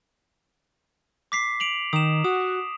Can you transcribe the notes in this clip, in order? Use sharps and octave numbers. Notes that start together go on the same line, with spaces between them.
D6 B6 C7
D7 F7 F#7
D#3 D#6 E7
F#4 D#6